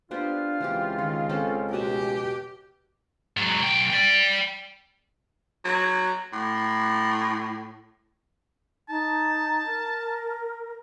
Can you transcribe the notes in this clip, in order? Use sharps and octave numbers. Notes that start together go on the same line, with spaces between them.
B3 D4 F4 G4 C5
C#2 E3 C4 G4
D#3
C4 C#4 A4
B2 G4 G#5 A5
G#2 F#3
B1 G5
D5 G5
F#3
A2
D#4 A5
A#4